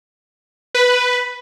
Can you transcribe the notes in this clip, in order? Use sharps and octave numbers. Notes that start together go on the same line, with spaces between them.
B4